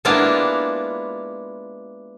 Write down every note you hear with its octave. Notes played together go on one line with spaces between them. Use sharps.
G#3 A#3 B3 D4 E4 F4